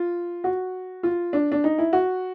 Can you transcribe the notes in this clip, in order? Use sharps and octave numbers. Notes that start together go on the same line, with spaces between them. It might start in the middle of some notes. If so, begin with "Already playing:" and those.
Already playing: F4
F#4
F4
D4
D4
D#4
E4
F#4